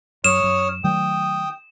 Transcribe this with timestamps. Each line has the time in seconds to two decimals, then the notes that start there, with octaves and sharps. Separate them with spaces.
0.24 F#2 C#5 D#6 F6 E7
0.43 F#2
0.84 D#3 F#3 A3 G5 D#6